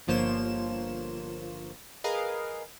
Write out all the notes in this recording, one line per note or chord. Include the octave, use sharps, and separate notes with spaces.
G1 F3 A#3 C5 C#5 E7
G#4 A#4 B4 D#5 F5